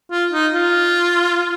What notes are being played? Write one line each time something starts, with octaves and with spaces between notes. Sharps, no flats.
F4
D#4
F4